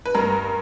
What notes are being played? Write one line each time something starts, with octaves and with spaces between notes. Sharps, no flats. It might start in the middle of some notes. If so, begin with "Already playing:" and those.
B4
G2 A#4